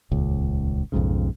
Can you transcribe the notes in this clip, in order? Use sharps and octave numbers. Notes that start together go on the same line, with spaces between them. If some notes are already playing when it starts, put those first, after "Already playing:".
D#1 C#2
B1 F2 G#2 C#3